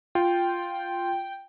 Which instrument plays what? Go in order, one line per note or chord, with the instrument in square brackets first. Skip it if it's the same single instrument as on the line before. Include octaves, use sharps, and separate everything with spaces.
[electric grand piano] F4 [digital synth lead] G5